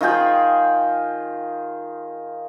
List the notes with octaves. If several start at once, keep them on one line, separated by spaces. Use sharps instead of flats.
D#3 F4 G#4 G5